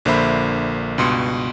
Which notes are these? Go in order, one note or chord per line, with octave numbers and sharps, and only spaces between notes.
A#1 D3 A#3 C5 E5 B5
C#2 G2 B2 C6 C#7